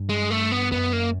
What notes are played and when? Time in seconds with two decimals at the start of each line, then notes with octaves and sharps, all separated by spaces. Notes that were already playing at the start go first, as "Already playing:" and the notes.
Already playing: G2
0.09 G#3
0.31 A3
0.52 B3
0.72 F#2 B3
0.93 A#3